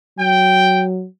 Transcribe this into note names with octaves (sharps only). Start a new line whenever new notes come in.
F#3 G5